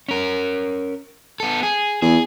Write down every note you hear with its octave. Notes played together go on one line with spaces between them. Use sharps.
C#4 A#4
B3 A4
G#4
E2 G#4